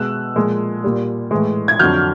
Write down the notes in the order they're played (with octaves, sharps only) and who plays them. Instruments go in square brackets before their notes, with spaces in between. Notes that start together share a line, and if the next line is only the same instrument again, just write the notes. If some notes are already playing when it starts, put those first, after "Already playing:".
Already playing: [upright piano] B2 G#3 E6 F#6
A#2 F3 G#3
A#2 G3
A2 E3 G#3
G#6
F2 D3 F#3 F6 G6